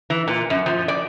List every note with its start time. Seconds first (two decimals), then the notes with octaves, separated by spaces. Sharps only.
0.10 E3
0.28 A#2
0.50 F#2
0.66 F3
0.88 D5